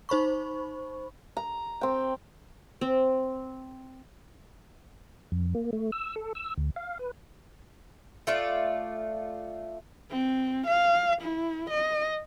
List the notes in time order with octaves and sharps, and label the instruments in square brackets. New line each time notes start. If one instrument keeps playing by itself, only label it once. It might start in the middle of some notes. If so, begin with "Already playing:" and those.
[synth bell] D#4 C5 B5 C#6
[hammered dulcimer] A#5
C4 G5
[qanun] C4
[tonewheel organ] F2
A#3
A3
E6
A4
E6
D2
F5
B4
[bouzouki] A3 F4 D5
[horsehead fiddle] C4
F5
E4
D#5